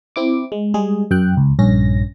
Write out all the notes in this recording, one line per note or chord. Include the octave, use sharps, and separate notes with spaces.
C4 E4 D6
G#3
G3 G#3 G#4
F#2 G5 F#6
C#2
A#1 G2 C#4 A#6